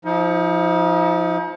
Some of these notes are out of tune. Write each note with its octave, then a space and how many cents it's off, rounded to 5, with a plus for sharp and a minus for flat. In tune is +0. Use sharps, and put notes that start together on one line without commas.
F3 +0 D#4 +40